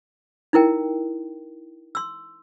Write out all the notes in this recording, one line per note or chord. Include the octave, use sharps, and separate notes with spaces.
D#4 E4 A#4 G5
C6 E6